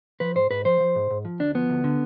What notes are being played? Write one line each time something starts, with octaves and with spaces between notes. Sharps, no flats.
F3 B4
G#2 C5
G#2 B4
F3 C5
F3
G#2
G#2
F3
D2 D4
F3 B3
D2
D3